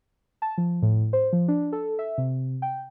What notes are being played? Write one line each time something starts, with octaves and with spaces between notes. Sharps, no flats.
A5
F3
A2
C5
F3
D4
A4
E5
C3
G5